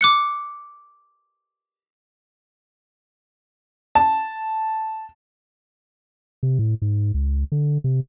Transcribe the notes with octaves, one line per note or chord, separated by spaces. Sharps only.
D6 F#6 C#7
A5
C3
A2
G#2
C#2
D3
C3